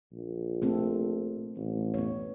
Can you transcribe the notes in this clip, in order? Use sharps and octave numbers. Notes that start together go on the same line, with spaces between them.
A#1
A3 C4 A4
A1
B3 C#5